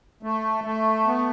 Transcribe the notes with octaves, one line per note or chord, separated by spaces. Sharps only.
A3
A3
B3